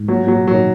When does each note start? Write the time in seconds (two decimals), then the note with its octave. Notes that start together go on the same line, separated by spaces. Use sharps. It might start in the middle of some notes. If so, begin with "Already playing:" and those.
Already playing: G#2
0.08 A#2 F#3
0.23 A#2 F#3
0.38 B2
0.47 F#3
0.53 D#3